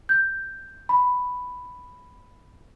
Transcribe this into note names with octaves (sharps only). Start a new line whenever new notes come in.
G6
B5